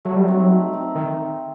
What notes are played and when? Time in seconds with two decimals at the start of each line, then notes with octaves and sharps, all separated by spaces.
0.05 F#3 A3
0.16 G3
0.25 F#3 C4 D#4
0.51 A3
0.73 C4 D#4
0.95 D#3